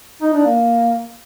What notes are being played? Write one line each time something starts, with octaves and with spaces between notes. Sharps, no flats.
D#4
D4
A#3